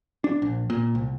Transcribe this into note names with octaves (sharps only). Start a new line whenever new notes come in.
D4
A#1
A#2
C2